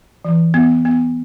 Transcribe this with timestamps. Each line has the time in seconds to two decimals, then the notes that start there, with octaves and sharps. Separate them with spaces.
0.25 E3
0.54 B3
0.85 B3